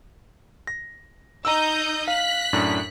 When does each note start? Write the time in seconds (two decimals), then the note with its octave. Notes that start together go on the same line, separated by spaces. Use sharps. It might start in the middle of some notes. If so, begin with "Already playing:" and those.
0.67 A#6
1.45 D#4 D#5 A#5 E6 G6
2.08 F5 F#6 B6
2.53 F#2 A2 D4